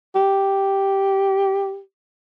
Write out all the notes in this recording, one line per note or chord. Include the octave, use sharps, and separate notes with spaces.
G4